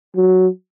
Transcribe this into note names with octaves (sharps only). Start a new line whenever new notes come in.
F#3